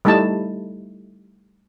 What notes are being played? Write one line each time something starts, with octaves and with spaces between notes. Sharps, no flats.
G3 A3 D#4 E4 A5